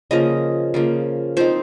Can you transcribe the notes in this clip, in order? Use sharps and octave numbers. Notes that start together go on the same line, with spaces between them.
C#3 F3 A#3 D#5
C#3 F3 A#3
F3 C4 D#4 C5